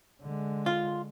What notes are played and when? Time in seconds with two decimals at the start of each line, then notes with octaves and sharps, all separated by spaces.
0.22 D3 G#3
0.66 F4